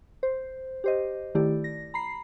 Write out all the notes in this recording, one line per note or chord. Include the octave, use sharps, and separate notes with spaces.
C5
G4 C5 D#5
D#3 A3 E4 G4 D5
A#6
A#5 B5 C7